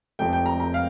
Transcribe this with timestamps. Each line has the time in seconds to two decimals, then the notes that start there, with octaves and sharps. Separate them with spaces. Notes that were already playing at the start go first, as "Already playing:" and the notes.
0.19 F1 F2 C3 F3 C4 G5
0.33 G5
0.46 A#5
0.60 A#5
0.74 F5